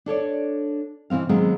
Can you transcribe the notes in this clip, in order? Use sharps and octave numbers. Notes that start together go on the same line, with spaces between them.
D4 A4 C#5 D5
B2 E3 A3 C4 F5
D#2 F#3 G#3 B3 C4